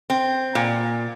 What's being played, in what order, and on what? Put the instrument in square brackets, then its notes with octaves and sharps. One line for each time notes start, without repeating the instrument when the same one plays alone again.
[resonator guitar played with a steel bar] C4
A#2